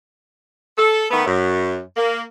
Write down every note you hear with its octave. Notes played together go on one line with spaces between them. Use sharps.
A4
D#3 A3 B3
F#2
A#3